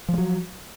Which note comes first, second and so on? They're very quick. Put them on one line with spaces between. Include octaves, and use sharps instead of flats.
F3 G#3 F#3